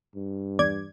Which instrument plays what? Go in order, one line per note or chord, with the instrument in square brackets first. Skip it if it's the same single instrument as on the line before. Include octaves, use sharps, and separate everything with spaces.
[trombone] G2
[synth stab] E2 D5 G#6